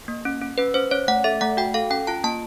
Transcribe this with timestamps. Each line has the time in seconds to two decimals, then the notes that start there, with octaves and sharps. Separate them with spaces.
0.08 A#3
0.25 C#4
0.42 C#4
0.58 C#4 B4
0.74 C#4 C5
0.91 C#4 C#5
1.08 A3 F#5
1.24 A4 E5
1.41 A3 F#5
1.57 F#4 G5
1.74 A4 F5
1.90 C#4 G5
2.07 F4 A5
2.24 A#3 A5